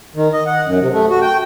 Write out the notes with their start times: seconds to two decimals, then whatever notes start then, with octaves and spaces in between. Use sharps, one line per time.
0.16 D#3
0.33 D#5
0.46 F#5
0.66 F#2
0.81 C3
0.92 A3
1.10 F#4
1.22 G5